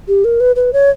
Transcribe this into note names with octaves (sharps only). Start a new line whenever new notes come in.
G4
A#4
B4
B4
C#5